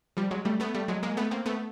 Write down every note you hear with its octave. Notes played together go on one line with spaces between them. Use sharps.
F3 G3
F#3 G#3
G3 A3
A3 B3
G3 A3
F#3 G#3
G#3 A#3
A3 B3
A#3 C4
A3 B3